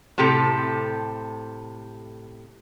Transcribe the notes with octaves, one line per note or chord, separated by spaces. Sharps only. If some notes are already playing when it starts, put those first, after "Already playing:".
A2 C3 G4 A4 A#5